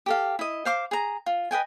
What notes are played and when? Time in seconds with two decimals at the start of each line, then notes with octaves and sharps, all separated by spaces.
0.06 G4 A4 F5
0.39 E4 D#5
0.65 C5 F5 D6
0.91 G#4 A#5
1.26 F4
1.51 B4 D#5 G5 G#5